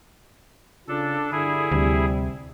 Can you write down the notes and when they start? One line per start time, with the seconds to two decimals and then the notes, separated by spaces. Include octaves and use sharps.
0.88 C#3 D4 F4 A4
1.32 G2 D3 E4 G#4
1.72 D2 C3 G3